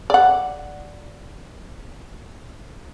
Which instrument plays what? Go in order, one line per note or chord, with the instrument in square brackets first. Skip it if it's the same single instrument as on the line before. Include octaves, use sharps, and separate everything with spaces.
[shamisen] D5 F#5